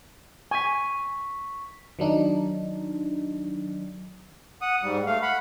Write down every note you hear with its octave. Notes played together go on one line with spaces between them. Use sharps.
G#5 C#6 B6
D#3 F#3 D4 D#4
F#5 D#6
G#2 G3
A3 F5
F#5 B5